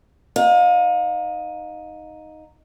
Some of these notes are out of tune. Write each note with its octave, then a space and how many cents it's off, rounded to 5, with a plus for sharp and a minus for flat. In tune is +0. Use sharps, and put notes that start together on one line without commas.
D#4 +0 F5 +35